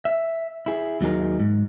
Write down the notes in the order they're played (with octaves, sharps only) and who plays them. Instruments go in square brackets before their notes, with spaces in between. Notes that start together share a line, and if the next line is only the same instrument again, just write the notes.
[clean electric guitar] E5
E4 G#4
D#2 F#3 D#4 G#4 A#4
G#2